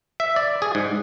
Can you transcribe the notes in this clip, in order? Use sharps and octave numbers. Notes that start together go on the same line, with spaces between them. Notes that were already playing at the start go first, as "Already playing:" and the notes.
E5
D5
G#4
G#2